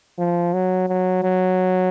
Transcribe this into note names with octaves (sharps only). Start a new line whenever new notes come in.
F3
F#3
F#3
F#3